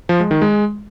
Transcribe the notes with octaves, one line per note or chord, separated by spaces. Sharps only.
F3
G#3
D#3
G#3